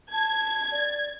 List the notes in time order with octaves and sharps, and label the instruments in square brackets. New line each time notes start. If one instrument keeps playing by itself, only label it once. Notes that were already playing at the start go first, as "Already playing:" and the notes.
[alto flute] A5 [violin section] G#6
[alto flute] D5